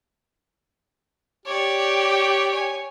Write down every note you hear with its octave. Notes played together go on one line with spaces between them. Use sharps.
G4 C#5 D5
C#5 G#5